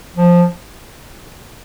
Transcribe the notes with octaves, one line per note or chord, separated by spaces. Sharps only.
F3